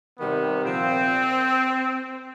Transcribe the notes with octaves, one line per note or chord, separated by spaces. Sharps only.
C3 D#3 G3 B3
A#2 F3 C4